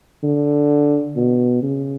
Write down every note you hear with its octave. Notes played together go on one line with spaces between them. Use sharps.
D3
B2
C#3